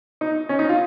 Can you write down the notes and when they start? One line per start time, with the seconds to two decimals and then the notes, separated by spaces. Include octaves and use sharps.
0.21 D#4
0.49 C#4
0.59 D#4
0.69 F4